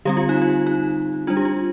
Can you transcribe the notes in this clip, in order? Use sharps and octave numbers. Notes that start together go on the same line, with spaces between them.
D3 G3 C4 G4
F4
D#4
F4
D#4
G3 D4 F4
G4
F4